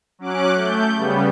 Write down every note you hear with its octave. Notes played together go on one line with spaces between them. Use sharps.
F#3 C#4 D6 F#6
A3 G6
C#3 G3 B3